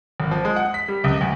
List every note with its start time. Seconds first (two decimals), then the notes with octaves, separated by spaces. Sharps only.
0.20 G#1
0.31 F3
0.45 G#3
0.56 F#5
0.74 B6
0.88 G3
1.04 C#2
1.21 D2